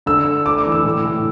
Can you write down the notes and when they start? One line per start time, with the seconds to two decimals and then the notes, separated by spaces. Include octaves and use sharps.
0.06 D3 E6
0.27 D3
0.46 A3 D6
0.58 D6
0.65 E3
0.72 E6
0.85 A2
1.04 A2